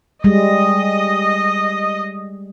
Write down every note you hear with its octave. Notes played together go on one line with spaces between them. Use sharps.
G3 G#3 D#5